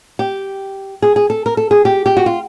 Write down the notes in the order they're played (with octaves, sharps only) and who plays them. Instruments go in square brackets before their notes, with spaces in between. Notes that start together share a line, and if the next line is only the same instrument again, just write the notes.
[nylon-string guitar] G4
G#4
G#4
A4
A#4
A4
G#4
G4
G4
F#4
F4